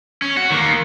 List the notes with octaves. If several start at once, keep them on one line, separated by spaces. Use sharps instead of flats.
C#4
F#4
D#3 A#3